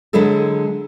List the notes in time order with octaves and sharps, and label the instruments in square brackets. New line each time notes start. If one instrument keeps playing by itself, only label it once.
[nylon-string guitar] D3 F#3 G#3 E4 G#4 A4